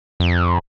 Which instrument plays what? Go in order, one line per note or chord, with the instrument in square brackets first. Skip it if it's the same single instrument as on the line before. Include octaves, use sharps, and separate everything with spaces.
[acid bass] F2